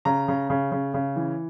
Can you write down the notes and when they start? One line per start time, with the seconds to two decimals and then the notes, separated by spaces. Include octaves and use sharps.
0.05 C#3 A#5
0.28 C#3
0.50 C#3
0.72 C#3
0.94 C#3
1.16 E3